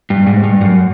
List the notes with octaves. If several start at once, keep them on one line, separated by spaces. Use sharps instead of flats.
G2
G#2
G2
F#2